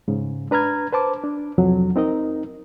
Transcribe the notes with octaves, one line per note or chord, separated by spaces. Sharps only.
G#2 C#3
D4 B4 A#5 F6 G#6
B4 C5 A5 D6
D4
C2 F2 F#3
C4 D#4 A#4 D#5